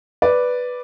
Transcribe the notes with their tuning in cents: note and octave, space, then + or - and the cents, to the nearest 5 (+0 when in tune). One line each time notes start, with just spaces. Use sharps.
B4 +0 D5 +0